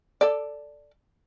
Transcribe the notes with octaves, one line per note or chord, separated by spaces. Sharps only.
A4 D5